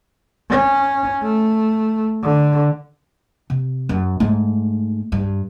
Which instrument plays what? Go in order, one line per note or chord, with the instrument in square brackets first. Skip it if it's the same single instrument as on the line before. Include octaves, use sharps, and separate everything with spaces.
[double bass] C#4
A3
D3
[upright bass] C3
F#2
G#2 A3
G2